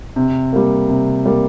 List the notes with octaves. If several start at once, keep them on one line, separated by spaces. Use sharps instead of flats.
C3
G3 A#3
C3
G3 A#3